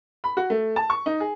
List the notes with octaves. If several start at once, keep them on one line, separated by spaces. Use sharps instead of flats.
B5
F#4
A3
A5
C#6
D#4
G#4